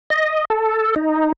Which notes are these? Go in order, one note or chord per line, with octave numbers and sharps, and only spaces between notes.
D#5
A4
D#4